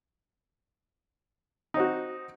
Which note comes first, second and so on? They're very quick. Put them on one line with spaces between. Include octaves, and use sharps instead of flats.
D#4 C4 F#4